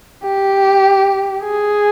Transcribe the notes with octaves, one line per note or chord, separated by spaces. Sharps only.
G4
G#4